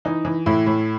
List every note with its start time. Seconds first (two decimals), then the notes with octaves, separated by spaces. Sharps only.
0.05 E3 D#4
0.25 E3
0.46 A2 E4
0.66 A2